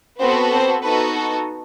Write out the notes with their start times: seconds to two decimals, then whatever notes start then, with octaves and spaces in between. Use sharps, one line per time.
0.20 B3 C4 F#4 A4 C5
0.52 C4 C5
0.83 B3 D#4 F#4 A4 B4
1.15 A4